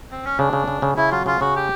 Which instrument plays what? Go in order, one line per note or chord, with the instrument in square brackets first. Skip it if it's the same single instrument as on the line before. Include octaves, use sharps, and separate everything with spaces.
[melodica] C4
C#4
[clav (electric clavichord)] C#3 [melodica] D4
[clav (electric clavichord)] C#3
C#3
C#3
[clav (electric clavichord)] C#3 [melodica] E4
[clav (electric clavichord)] F#3 [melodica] F4
[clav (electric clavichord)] C#3 [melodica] F4
[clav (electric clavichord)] C#3 [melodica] F#4
[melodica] G4